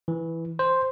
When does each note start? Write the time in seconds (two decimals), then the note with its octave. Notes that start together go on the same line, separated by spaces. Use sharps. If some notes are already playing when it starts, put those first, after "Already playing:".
0.08 E3
0.59 C5